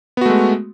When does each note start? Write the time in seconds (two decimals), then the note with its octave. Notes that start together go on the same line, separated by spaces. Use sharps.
0.17 B3
0.21 F#4
0.26 A3
0.30 G#3